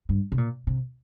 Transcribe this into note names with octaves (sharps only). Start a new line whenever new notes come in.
G2
C3
A#2
C3